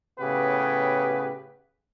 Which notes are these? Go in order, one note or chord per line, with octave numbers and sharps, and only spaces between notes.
A2 C#3 B3 G4 B4